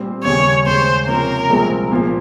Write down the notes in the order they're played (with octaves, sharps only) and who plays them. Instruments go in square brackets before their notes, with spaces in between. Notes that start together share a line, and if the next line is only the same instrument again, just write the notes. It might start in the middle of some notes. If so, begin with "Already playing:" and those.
Already playing: [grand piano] A#2 G3 C4
[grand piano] D#2 C#3 G3 [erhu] C#5
[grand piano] D#2 C#3 G#3 [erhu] C5
[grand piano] C3 F3 A#3 C#4 [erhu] A#4
[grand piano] C2 A#2 F3 G#3 C4
A#2 F3 A#3